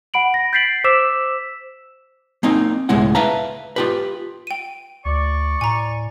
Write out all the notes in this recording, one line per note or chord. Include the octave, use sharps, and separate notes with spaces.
F#5 B5 D7 F#7
A#6
G6 A6 B6 C7 D7 F#7
C5 D6 E6 B6 E7
A#3 C4 D#4
C#2 A2 G#3 B3 E4 F#5
B4 E5 F5 A5 A#5
F4 G4 B4
G5 D#7
D2 D5 C#6
A2 G#5 A#5